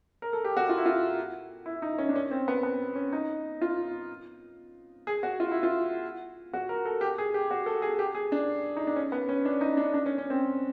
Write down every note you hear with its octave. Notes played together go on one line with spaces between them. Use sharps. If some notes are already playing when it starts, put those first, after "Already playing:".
A#4
A4
G4
F#4
F4
E4
F4
E4
D#4
C#4
D4
C#4
C4
B3
B3
C#4
D#4
F4
G#4
F#4
F4
E4
F4
F#4
A#4
A4
G4
G#4
G4
F#4
A4
G#4
G4
G#4
D4
D#4
D4
C#4
B3
C#4
D4
D#4
D4
D4
C#4
C#4
C4